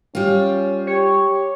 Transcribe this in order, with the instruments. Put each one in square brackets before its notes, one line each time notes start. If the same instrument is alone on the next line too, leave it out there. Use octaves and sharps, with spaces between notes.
[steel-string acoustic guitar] G3 F4 [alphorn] C#4
[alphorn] G4 [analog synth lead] C#5